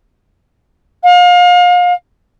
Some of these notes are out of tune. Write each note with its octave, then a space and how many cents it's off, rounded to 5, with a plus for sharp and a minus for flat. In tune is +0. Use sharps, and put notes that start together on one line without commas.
F5 +35